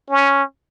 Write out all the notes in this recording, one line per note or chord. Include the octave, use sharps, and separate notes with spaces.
C#4